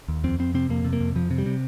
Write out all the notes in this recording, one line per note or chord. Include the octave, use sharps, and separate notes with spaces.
D#2
F2 C4
F2 C4
C3 C4
F2 A#3
C3
A#3
F2
F2 F3
C3
G3
C3